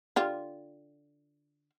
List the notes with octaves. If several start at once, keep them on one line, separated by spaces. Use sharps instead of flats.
D3 F4 G4